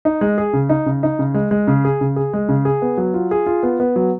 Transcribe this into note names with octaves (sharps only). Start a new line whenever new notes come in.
D#4
G#3
G#4
C#3
D#4
C#3
D#4
C#3
G#3
G#3
C#3
G#4
C#3
G#4
G#3
C#3
G#4
B3
F#3
F4
G#4
F4
B3
B3
F#3